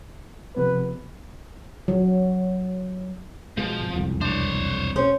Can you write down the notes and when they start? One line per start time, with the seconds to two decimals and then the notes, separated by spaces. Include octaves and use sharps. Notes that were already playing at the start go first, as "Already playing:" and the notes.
0.56 C3 F3 B3 B4
1.88 F#3
3.57 B2 F3 G#3
3.79 G#1
3.94 E1 C2 F2
4.21 D4 C5 C#5
4.96 C#4 C5